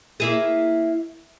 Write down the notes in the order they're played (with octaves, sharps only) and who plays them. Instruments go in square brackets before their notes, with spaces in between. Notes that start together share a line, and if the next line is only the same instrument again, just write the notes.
[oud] A#3 E4 G#4